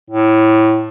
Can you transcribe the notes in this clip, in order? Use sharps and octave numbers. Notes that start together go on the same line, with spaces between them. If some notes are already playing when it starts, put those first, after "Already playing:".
A2